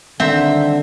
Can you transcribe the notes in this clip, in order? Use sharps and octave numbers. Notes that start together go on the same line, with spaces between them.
D3 D#3 G3 C4 E5